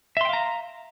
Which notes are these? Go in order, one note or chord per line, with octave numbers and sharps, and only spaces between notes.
E5 F5 G5 A#5 C6